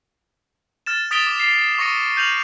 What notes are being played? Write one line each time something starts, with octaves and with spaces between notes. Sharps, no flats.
F6 A6 E7
D#6 A6 B6 D7 F7 G7
D6
C7
C#6 D6 A#6 C#7 D#7
F6 G6 D#7 F7 F#7